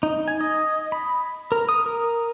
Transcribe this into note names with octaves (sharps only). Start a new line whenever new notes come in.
D#4
G#5
D#5
B5
A#4
D#6
A#4